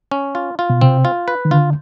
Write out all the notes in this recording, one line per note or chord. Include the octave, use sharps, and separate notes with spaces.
C#4
F4
F4
B2
C3 C4
F4
B4
D#3
D3 F4